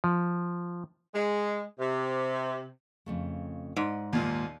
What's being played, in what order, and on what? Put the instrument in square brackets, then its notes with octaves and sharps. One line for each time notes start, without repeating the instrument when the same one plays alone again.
[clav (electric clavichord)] F3
[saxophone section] G#3
C3
[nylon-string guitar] F2 C#3 A3
[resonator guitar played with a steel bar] G#2 [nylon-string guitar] D5 D#5
[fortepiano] D#2 A#2 [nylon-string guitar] F5